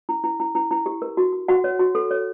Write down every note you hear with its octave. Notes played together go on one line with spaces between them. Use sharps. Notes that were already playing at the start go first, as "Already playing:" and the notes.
E4
E4
E4
E4
E4
G4
A#4
F#4
F#4
F#4 F#5
C#5
F#4
A4
C#5